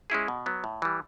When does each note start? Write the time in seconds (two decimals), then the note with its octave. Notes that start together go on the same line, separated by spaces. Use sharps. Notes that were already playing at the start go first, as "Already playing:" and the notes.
0.10 G#3 C#4 E4 G#4
0.28 B2
0.46 F#3 B3
0.64 A2
0.82 E3 G3